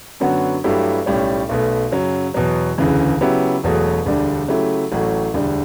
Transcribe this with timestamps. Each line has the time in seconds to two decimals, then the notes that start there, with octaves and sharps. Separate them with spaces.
0.20 F#2 D3 F#3 B3 F#4
0.64 G2 F#3 A3 E4 G4
1.06 B1 A2 G3 C#4
1.49 B1 B2 A3
1.91 F#2 C#3 F#3
2.34 E2 B2 F#3
2.78 E1 D2 C#3 E3
3.21 C#3 F#3 B3 E4 G4
3.64 E1 E2 B2 F#3 A3
4.06 E1 D2 D3 G3 D4
4.48 C#3 F#3 A3 E4 G4
4.92 A1 A2 F#3 A3
5.34 E1 D2 D3 G3